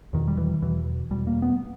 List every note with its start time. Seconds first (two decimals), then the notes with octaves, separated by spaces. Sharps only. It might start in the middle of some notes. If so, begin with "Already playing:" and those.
0.13 E2 B2 D#3
0.28 G3
0.37 E3
0.62 E2 B2 E3
1.11 E2 B2 G3
1.27 A#3
1.42 B3